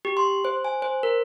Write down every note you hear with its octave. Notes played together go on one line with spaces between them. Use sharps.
G4
C6
C5
G#5
C5
A#4